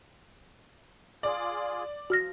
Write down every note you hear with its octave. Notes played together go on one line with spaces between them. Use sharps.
F4 G#4 D5
F3 F#4 F6 A#6